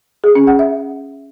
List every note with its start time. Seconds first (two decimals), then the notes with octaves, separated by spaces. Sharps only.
0.24 G#4
0.35 C#4
0.47 F#5
0.59 E5